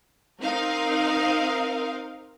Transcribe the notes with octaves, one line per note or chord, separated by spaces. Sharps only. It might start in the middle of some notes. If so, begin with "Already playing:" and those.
C4 D#4 A#4 F5